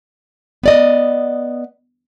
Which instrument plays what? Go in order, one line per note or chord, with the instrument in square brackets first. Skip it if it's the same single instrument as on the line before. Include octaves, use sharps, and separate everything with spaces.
[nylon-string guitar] B3 D5 D#5